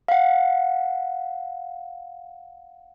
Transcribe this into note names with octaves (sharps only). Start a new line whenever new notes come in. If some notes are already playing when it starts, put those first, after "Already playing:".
F5 F#5